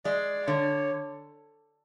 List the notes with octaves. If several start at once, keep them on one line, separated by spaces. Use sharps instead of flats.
G#3 D5
D3 C#5